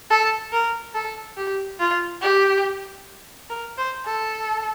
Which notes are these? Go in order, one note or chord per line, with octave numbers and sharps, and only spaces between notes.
A4
A#4
A4
G4
F4
G4
A#4
C5
A4